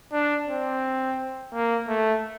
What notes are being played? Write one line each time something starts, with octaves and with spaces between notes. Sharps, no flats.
D4
C4
A#3
A3